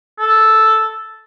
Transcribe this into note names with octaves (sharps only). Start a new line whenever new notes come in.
A4